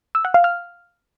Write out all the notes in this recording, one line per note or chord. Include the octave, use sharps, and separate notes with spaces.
E6
F#5
F5
F6